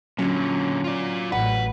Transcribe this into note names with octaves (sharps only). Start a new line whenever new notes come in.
A#2 D3 F#3 C#4
F4 D5
A1 B4 F#5